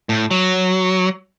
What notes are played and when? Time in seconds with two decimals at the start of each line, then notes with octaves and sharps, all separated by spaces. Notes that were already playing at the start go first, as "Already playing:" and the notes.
0.09 A2
0.31 F#3